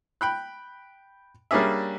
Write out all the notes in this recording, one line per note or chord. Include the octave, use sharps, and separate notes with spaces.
G5 B5 F#6
G3 A#3 C#4 D4 G#4 E5